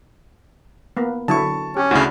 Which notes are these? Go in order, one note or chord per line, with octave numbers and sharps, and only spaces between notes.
A#3 B3
D3 F#3 E4 A5 C#6
C#4 G4
D2 C#3 D4 E4 F#4